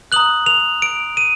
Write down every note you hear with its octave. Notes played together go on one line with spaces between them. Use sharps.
A#5 D#6 F#6 F#7
F7
D7
D#7